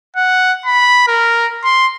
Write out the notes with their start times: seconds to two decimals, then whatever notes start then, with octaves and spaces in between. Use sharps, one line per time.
0.17 F#5
0.66 B5
1.08 A#4
1.64 C6